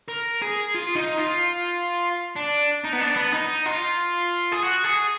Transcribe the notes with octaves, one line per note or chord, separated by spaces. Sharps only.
A#4
G#4
F4
D#4
F4
D4
D#4
B3
D4
B3
D#4
F4
G#4
F#4
G#4